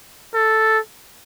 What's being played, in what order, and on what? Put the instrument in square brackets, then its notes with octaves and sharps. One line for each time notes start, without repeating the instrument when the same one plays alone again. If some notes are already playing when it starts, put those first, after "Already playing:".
[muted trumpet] A4